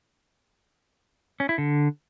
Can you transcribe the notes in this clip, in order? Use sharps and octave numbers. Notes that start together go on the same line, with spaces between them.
C#4
E4
D3